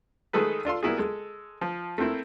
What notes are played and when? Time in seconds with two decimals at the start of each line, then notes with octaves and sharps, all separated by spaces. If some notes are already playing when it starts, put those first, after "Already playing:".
0.33 D#3 G#3 A3 G#4 A4 B4
0.65 D4 F4 A4 C6
0.83 G3 A#3 B3 E4 F#4 G#4
0.98 G#3 A4
1.61 F3
1.98 A3 A#3 C4 E4